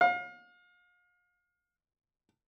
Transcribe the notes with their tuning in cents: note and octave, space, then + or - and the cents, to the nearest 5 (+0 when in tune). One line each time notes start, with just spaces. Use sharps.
F5 +35